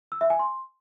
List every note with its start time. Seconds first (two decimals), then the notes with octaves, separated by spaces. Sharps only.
0.12 E6
0.21 E5
0.30 G#5
0.39 C6